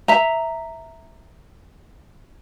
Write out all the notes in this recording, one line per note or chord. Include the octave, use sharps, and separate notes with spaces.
E5 A#5